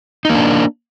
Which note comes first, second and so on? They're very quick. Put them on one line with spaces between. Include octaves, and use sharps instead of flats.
D#4 A#3 D4